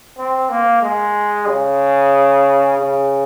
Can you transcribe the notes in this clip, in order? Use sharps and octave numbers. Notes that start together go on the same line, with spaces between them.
C4
A#3
G#3
C#3
C#3